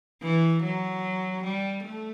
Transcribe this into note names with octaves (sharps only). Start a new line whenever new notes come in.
E3
F#3
G3
A3